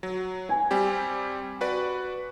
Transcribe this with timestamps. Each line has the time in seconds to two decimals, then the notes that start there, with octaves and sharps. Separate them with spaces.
0.03 F#3
0.49 G#5
0.71 G3 C4 G4
1.61 F#4 B4 D5